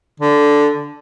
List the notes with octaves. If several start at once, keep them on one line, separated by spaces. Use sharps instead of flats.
D3